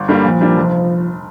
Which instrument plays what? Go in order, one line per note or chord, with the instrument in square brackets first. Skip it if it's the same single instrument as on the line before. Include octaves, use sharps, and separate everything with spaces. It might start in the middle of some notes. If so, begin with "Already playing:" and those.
Already playing: [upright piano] G1
G2 D3 G3 A#3
[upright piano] A#2 [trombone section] F3
[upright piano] G3 A#3 D4
F1